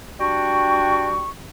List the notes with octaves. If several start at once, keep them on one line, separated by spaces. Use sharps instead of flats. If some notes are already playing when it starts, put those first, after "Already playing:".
G3 D4 F#4 G5 C#6